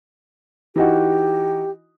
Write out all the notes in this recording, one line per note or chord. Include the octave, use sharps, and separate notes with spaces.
E3 D#4 F#4 G4